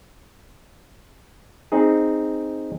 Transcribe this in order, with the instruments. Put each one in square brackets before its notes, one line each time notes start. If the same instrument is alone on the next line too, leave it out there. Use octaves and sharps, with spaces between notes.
[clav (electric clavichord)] C4 D#4 G#4